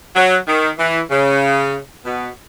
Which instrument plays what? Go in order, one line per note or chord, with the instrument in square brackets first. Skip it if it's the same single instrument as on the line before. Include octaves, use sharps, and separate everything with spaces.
[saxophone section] F#3
D#3
E3
C#3
B2